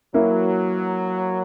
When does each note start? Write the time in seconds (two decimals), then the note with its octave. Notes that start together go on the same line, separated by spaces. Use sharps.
0.14 E3 F#3 A#3 E4